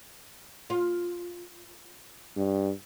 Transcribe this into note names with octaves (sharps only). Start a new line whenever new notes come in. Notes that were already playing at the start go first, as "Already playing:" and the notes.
F4
G2